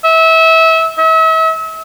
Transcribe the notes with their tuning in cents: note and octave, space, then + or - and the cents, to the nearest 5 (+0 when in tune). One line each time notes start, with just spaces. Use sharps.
E5 -25
E5 -35